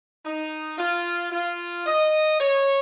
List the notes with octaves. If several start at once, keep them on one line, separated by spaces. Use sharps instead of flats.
D#4
F4
F4
D#5
C#5